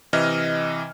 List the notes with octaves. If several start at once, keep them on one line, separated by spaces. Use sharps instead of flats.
C3 E3 D#5 F6